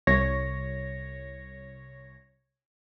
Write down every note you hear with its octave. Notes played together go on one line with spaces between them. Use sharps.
C2 C#5 A#6